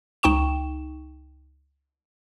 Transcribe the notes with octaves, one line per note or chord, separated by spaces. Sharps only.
C#2 D#4 G5 C#6 E7